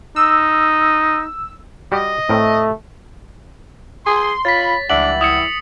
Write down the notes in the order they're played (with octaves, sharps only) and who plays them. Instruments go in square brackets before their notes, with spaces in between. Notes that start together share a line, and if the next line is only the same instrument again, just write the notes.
[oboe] D#4 [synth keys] E6
[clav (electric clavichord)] G3 F#4 G4 [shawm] D#5
[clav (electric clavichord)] A2 C4 A#4 [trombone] A3
[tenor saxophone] G#4 [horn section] C6
[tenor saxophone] F4 [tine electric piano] C#5 [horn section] B5 [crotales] A6 B6
[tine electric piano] C#2 E5 F#5 [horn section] E3 G3 [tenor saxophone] D4 [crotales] F#7
[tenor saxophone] E4 [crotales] D#6 C#7